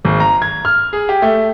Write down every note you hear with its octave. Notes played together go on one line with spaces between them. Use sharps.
G#1
A#5
G#6
F6
G#4
G4
A3